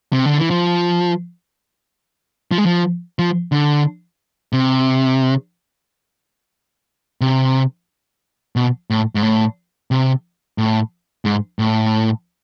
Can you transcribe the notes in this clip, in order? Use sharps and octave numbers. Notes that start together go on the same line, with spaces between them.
C3
D3
E3
F3
F3
G#3
F3
F3
D3
C3
C3
B2
A2
G#2
A2
C3
A2
G#2
A2